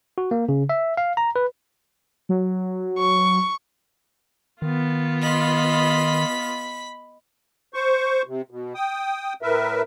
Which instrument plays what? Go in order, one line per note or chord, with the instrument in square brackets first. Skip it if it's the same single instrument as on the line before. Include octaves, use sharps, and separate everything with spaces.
[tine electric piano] F#4
A#3
C#3
E5
F5
A#5
B4
[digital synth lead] F#3
[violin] C#6
[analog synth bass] D#3 [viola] B3 F4
[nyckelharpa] D#5 C6 [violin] B5 B6
[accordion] C5 C#6
C3
B2
G5 D#6
A2 A#4 B4 E5